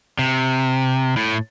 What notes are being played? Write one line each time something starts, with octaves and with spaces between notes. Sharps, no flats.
C3
A2